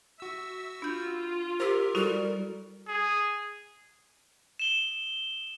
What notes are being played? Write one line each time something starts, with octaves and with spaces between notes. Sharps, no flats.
F#4 E5 E6
D4 F4 G6
G4 A#4 C5 E6
G3 E4 F#4 A4
G#4
E7 G7